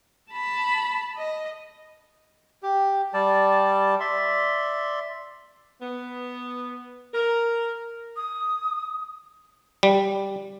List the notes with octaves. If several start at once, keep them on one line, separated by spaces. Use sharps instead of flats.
A5 B5
D#5
G4
G3 D5 A5
D5 E5 C6
B3
A#4
D#6
G3